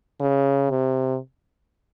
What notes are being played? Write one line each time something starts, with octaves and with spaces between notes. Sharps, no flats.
C#3
C3